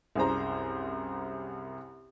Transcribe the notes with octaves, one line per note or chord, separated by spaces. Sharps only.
C2 F#2 G#4 C5 A#5